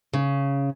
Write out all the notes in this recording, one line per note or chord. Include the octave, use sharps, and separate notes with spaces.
C#3